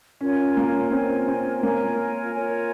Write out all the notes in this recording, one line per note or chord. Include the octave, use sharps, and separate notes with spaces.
C#4 F4 A#4 C#5 G#5
A#3
C4 F4 A#4 C#5 G#5
C4
A#3 F4 A#4 C#5 G#5
F4 A#4 C#5 G#5